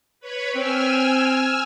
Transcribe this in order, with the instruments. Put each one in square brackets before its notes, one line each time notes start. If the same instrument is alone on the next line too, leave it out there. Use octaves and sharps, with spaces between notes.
[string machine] B4 C#5 B5
[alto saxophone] C4 [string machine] G#5 E6 F6